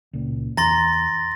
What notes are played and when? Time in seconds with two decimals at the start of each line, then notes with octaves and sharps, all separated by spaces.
0.13 C#2 A#2
0.57 E2 A#5 C6 A6 A#6